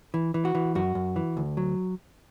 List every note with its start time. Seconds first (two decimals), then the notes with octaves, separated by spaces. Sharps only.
0.14 E3
0.34 E3
0.45 F#4
0.55 E3
0.75 F#2 F#4
0.95 F#2
1.16 E3
1.37 D2
1.57 F#3